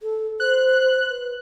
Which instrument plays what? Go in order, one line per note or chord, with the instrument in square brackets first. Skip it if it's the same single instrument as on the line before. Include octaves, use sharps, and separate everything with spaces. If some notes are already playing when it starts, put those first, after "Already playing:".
[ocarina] A4
[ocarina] C5 [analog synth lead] F#6
[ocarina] B4